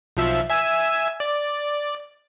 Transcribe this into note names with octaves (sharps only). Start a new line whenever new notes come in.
B1 F3 E5
E5 G#5 E6
D5